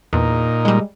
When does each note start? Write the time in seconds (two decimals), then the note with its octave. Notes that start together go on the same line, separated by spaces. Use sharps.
0.13 E2 A#2 D#4
0.65 G3 G#3